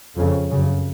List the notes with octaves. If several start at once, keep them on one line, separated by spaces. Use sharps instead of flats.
F2 C#3
F#2 C#3